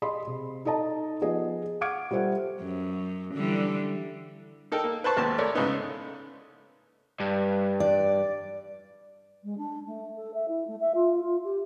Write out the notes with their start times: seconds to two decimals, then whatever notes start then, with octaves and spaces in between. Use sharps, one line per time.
0.02 G#4 D#5 B5 C6
0.27 C3
0.65 D#4 A4 D#5 A5 A#5
1.21 F3 B3 G#4 D#5
1.81 F#5 C#6 D6 F6 G#6 D7
2.11 G3 F4 A4 C5 E5 F#5
2.61 F#2
3.35 D3 E3 G3
4.72 D#4 A4 A#4 G5
4.84 A#3
5.04 B4 C5 A5 C#6
5.16 G#1 D#2 B3 A5 C6
5.38 A3 A#4 C#5 D5
5.55 G#2 C#3 G#3 A3 B3 D#4
7.20 G2
7.80 D5
9.43 G#3
9.57 D4
9.86 A3
10.15 A4
10.33 E5
10.48 E4
10.67 A3
10.80 E5
10.94 F4
11.23 F4
11.44 G4